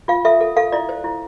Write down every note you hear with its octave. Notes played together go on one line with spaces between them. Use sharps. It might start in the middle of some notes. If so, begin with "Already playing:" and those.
F4 F5
A4 E5
A4
A4 F5
E4 D5
C5
E4